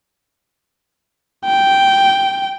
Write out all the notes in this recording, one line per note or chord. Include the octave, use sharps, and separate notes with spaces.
G5